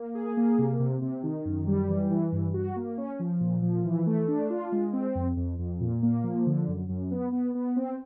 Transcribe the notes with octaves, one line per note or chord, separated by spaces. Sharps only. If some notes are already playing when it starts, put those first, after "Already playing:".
Already playing: A#3
G#4
A#3
C3
C3
C3
D#3
F#2
G3
E3
E3
G2
F#4
A#3
C#4
F3
A#2
F3
E3
A3
D4
F4
G#3
C4
F2
F2
F2
A#2
A#3
F3
D3
F#2
F#2
B3
B3
B3
C4